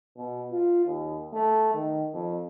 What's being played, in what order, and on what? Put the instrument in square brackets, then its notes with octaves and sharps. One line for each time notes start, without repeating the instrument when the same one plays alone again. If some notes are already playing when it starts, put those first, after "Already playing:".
[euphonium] B2
F4
D#2
A3
D#3
F2